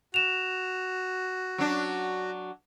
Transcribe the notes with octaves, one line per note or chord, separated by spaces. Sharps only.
F#4 E7 F7
F#3 D4